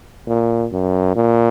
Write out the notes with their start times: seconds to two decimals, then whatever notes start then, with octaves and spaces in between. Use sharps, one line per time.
0.28 A#2
0.72 F#2
1.16 A#2